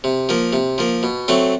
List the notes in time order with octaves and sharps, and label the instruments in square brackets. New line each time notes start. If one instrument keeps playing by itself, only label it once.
[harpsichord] C3
F3 A#3
C3
F3 A#3
B2
F#3 A3 C4